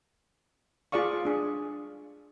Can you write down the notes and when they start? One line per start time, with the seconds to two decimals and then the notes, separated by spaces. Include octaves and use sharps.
0.92 F4 G#4 D5 F5 C#6
1.25 D4 G#4